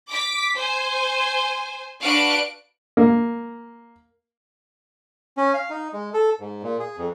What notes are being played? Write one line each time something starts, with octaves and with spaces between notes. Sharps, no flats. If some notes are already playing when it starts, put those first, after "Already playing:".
D6 B6
C5 G#5
D4 F#4 B4 F5 F#6 D7
A#3
C#4
F5
D#4
G#3
A4
G#2
A#2
G#4
F2